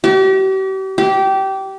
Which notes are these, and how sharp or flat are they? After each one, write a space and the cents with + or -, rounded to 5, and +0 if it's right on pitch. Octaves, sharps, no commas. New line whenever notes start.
G4 -40
G4 -20